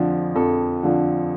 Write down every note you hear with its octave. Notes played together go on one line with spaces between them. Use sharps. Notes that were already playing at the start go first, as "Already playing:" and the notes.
Already playing: F2 D3 F3
F2 A4
D3 F3